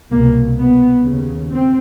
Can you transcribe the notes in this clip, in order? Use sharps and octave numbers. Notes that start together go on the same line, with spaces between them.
C2 B2 A#3
B3
D#2 C#3
C4